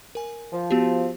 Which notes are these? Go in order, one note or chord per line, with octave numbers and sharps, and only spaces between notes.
A#4 G#5
F3
B3 F#4 G4